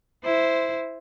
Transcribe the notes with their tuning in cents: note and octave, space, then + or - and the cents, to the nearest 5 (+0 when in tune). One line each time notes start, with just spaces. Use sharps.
E4 +0 C5 -10